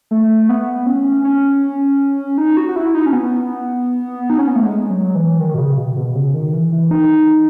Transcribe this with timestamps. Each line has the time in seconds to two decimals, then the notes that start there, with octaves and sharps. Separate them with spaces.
0.11 A3
0.49 B3
0.86 C#4
1.24 C#4
2.38 D#4
2.57 F#4
2.69 F#4
2.76 E4
2.94 D#4
3.06 C#4
3.13 B3
4.30 D#4
4.38 C#4
4.47 B3
4.56 A3
4.65 G#3
4.90 F#3
5.15 E3
5.40 D#3
5.54 B2
5.58 C#3
5.77 B2
5.96 B2
6.15 C#3
6.34 D#3
6.53 E3
6.72 E3
6.91 D#4